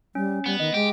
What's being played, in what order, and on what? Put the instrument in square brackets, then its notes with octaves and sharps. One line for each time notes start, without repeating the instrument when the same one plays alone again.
[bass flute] G3 [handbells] C#4
[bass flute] G3 [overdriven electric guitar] B3
[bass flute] D#3 [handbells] D#5
[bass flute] G#3 [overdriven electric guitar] G4